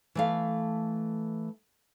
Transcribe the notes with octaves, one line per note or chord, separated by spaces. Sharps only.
E3 A3 F5